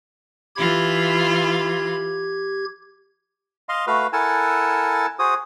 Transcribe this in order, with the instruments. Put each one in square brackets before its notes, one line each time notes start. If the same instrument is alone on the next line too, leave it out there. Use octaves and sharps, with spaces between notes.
[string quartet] E3 F4 B5 [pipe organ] G4 G#6
[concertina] D#5 F5 C6
A3 F#4 B4 F5
E4 A4 A#4 F#5 G#5 A5
F#4 G#4 C5 D#6